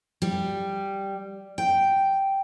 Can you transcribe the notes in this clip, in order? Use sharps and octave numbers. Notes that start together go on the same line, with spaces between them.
G3
G5